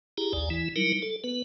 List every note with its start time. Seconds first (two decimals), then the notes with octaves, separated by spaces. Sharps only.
0.18 E4 G4 G#4 A#5
0.33 A#1 D#2 D5 G#5
0.50 E3 E4
0.76 F#3 G3 D#4 E4 A#4
1.02 A4
1.24 B3 B4